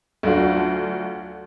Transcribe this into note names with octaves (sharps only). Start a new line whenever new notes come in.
D2 F#3 A3 D4 F4 F#4